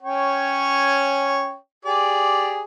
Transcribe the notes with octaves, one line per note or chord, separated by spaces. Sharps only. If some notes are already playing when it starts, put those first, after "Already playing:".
C#4 C#5 G5
G4 G#4 D5